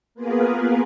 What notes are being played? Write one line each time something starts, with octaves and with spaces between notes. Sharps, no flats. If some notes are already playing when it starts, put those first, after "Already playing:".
A#3 B3 F4 G#4 A#4 B4